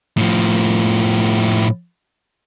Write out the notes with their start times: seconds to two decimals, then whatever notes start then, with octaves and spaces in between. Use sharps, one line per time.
0.18 A2 F3